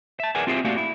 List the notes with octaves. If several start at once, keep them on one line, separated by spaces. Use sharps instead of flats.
E5 A5
G#4 A#4 B4 D5 F#5 G#5
C4 F4 G4 G#4 E5
A3 A#3 F#4 G4 D5 F5
E4